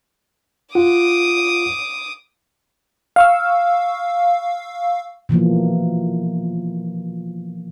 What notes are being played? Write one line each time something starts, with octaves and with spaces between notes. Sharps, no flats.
F4 F#5 D6 D#6
F5 C#6 E6
B2 E3 F3 A#3